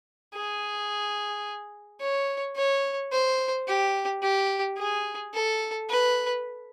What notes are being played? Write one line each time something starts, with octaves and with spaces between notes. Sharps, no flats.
G#4
C#5
C#5
C5
G4
G4
G#4
A4
B4